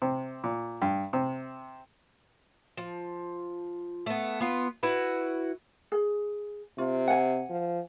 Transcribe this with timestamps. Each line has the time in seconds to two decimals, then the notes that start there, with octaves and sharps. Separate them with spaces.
0.02 C3
0.44 A#2
0.82 G2
1.13 C3
2.77 F3
4.06 A3 B3
4.40 B3 F4
4.83 E4 F#4 B4
5.92 G#4
6.78 C3 F4
7.08 F#5 G#5
7.50 F3